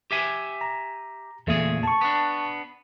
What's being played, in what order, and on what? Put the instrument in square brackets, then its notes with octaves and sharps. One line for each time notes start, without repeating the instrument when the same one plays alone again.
[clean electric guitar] G4 E5 G#5
[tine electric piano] A#5
[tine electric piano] E2 A3 [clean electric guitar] A#2 C#3 G#4
[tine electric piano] A5 C#6
[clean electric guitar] B3 D4